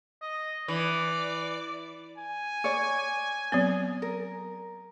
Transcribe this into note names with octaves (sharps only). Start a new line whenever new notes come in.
D#5
E3 D5
G#5
C#5 D5
F#3 B3 C4
A#4